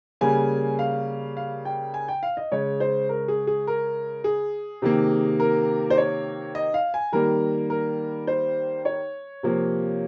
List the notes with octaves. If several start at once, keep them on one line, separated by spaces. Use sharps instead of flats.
C#3 G3 A#3 G#5
F5
F5
G5
G#5
G5
F5
D#5
C#3 G#3 C#5
C5
A#4
G#4
G#4
A#4
G#4
C3 D#3 A#3
A#4
C5
C#5
D#5
F5
G#5
D#3 G3 A#3 A#4
A#4
C5
C#5
C3 F3 A#3